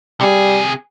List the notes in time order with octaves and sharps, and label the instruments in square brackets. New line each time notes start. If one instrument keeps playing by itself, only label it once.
[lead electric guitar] C3 G#4 [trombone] G3